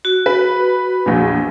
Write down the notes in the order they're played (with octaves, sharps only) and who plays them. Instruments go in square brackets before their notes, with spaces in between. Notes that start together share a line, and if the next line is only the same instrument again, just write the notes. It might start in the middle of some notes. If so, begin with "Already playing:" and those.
[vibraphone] F#4
[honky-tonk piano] B4
A#1 E2